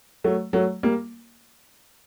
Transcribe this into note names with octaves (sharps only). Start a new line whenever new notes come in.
F#3 A3
F#3 A3
G3 A#3